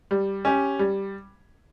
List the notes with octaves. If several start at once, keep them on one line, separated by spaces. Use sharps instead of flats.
G3
C#4 G4
G3